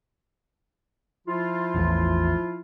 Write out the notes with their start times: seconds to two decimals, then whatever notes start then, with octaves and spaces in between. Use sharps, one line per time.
1.28 F3 E4 F4
1.74 A1 E2 A2